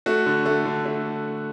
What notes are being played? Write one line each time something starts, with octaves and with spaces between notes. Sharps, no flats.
A3 F#4
D3
A3
D3
A3